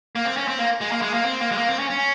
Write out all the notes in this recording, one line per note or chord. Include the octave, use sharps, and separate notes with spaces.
A#3
C4
C#4
C4
A#3
G#3
A#3
G#3
A#3
C4
A#3
G#3
A#3
C4
C#4
C#4